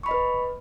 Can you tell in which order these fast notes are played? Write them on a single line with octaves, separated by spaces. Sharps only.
C#6 B5 D#5 B4